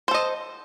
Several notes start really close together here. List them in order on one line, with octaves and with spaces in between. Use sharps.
C5 A4 D#5